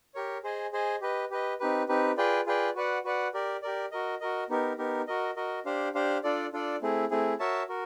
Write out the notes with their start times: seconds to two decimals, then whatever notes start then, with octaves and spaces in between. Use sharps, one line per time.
0.15 G4 A#4 C#5
0.43 G#4 C5 D#5 G#5
0.72 G#4 C5 D#5 G#5
1.01 G4 B4 D#5
1.31 G4 B4 D#5
1.60 C4 D#4 G4 B4
1.88 C4 D#4 G4 B4
2.17 F4 G#4 B4 D5 G5
2.46 F4 G#4 B4 D5 G5
2.75 F#4 B4 D5 F#5
3.04 F#4 B4 D5 F#5
3.34 G4 A#4 D5
3.62 G4 A#4 D5
3.92 F#4 A#4 D#5
4.20 F#4 A#4 D#5
4.49 B3 D#4 G4 A#4
4.78 B3 D#4 G4 A#4
5.07 F#4 A#4 D#5
5.36 F#4 A#4 D#5
5.65 D4 G4 C5 F5
5.95 D4 G4 C5 F5
6.24 D4 F4 A4 D5
6.53 D4 F4 A4 D5
6.82 A3 C4 E4 G#4
7.11 A3 C4 E4 G#4
7.39 F#4 A#4 C#5 E5 A5
7.68 F#4 A#4